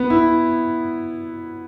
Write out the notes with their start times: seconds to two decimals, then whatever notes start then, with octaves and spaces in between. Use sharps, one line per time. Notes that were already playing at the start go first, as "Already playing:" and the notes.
Already playing: B3
0.10 E4